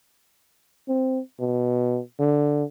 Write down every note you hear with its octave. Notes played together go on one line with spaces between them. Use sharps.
C4
B2
D3